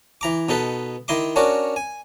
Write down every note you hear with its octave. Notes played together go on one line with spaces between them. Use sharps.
E3 A#5 D6
B2 D#4 A4 B4
D#3 E4 D#5 C6 D6
C#4 D4 F#4 A#4 D5
G#5